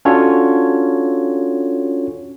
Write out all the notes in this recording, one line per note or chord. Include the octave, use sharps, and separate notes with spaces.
C#4 D4 F4 F#4 A4 C#5